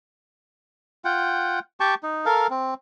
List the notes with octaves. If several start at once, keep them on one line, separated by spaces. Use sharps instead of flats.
F4 F#5 G5
G4 G5 A5 C#6
D#4
A4 A#4 F5
C4